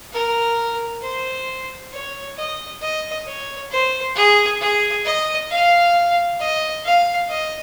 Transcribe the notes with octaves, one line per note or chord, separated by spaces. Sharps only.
A#4
C5
C#5
D#5
D#5
C#5
C5
G#4
G#4
D#5
F5
D#5
F5
D#5